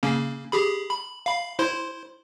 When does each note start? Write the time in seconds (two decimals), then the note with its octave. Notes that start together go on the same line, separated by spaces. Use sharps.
0.03 C#3 A#3 C#4
0.52 G4 G#4 B5
0.90 B5
1.26 F5 B5
1.59 E4 C5 C6